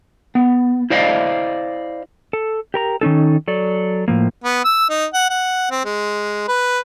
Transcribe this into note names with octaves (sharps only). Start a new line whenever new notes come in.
B3
E4 C5 D5 D#5 F5
A4
G4 A#4 A#5
D#3 C#4 D#4 A4
F#3 A4 D5
A2 F3 A#3
B3
E6
D#4
F#5
F#5
C4
G#3
B4